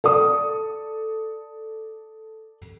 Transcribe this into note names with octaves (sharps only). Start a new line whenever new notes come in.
A4 D5 D#6